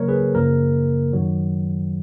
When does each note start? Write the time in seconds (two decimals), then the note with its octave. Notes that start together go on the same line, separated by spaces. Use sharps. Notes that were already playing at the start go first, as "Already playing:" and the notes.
Already playing: C#3 F#3 A#3 A#4 C#5
0.08 G#4 B4
0.35 F#2 C#3 F3 A#3 A#4
1.13 F#2 D#3 F#3